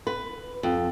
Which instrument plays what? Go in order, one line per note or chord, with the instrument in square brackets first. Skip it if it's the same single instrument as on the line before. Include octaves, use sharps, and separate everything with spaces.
[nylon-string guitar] B4
F2